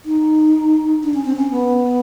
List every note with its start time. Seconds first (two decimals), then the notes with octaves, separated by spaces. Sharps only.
0.05 D#4
1.04 D4
1.14 C#4
1.25 C4
1.36 C#4
1.51 B3